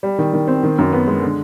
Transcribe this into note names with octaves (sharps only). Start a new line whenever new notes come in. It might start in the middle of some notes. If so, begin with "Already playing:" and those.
G3
D#3
D#3
C4
D#3
F#2
B3
G#3
D3